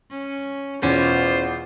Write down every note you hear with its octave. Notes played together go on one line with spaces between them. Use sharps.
C#4
E2 B2 C#4 F4 C5